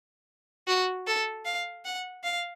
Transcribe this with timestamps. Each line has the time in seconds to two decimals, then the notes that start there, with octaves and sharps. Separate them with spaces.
0.67 F#4
1.07 A4
1.45 F5
1.85 F#5
2.24 F5